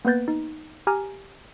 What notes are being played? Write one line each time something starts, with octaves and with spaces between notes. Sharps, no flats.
A#3 B3 B4 G6 A6
D#4
G4 G#5 A#5 F6